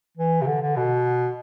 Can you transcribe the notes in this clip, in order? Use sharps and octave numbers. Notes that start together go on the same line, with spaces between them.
E3
C3
D3
D3
B2